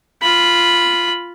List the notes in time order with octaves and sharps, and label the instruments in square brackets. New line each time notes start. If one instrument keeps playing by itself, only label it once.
[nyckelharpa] F4 B5